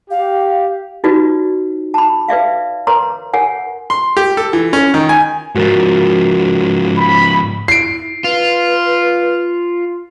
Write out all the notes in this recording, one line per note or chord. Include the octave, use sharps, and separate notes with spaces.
G4 F5
D#4 F4 F#4 B4 D5
A5 B5
B4 D5 E5 F5
A#4 B4 C#5 A#5 C6
A#4 C#5 F#5 G#5
C6
G4
A4
E3
C#4
D#3
G#5
G#2 F3 F#4 A#4 A6
B5
E4 C7 D7
F4 B4